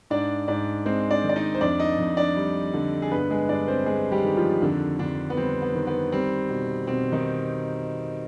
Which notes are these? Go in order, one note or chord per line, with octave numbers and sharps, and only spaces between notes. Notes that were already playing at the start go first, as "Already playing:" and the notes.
G#2 D4 D5
G#2 D4 D5
G#3 C4 C5
D4 D5
D#3
D5
D#4 D#5
C5
F2 D4 D5
D#4 D#5
F2
D4 D5
G3
D3
G#4
G2 B3 B4
G#3 G#4
G2 D4 D5
C4 C5
G3 G#3 G#4
G3 G4
D#3
F3 F4
F2 D3 D4
F2 D3 D4
B3
G3 C4
B3
D#3
B3
G3 C4
B2
B2 C4
D#3 D#4